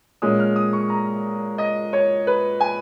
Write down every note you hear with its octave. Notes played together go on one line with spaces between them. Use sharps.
A#2 G#3 C#4 D#6
F6
D#6
C#6
A#5
D#5
C#5
B4
G#5